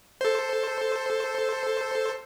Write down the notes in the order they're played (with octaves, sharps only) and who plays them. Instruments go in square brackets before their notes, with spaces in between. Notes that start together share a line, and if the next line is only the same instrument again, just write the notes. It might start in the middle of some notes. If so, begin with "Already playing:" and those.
[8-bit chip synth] A4 C5